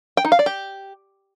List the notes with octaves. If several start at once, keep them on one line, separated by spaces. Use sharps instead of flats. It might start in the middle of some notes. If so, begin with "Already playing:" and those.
G5
D#4
F5
D5
G4